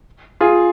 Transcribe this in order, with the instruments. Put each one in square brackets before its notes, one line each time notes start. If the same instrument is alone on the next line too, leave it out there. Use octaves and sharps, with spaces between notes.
[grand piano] F4 G#4